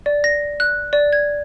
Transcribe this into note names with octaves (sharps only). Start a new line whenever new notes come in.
D5
A#6
F#6
D5
G#6